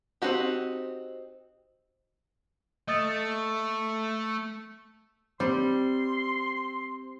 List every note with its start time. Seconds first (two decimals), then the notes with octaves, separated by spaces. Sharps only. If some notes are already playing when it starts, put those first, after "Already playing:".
0.22 C4 D#4 F#4 G4
2.88 A3 D#5 D#6 A6
5.40 G3 C4 C6